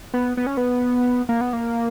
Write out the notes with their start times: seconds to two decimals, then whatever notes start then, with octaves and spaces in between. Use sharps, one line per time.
0.14 B3
0.37 B3
0.46 C#4
0.57 B3
1.29 A#3
1.41 B3
1.53 A#3